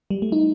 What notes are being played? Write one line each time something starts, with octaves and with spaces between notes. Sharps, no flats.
G3
A3
D#4